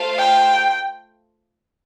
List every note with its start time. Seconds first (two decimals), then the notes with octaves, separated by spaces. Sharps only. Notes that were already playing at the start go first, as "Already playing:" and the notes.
Already playing: A3 F4 C5 F5
0.19 G5